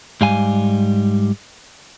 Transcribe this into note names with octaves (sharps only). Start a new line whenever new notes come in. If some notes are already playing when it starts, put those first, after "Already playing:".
G#2 G3 F5 G#5